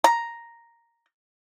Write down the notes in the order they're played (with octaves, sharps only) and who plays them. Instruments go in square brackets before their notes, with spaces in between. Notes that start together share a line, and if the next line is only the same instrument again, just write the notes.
[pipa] A#5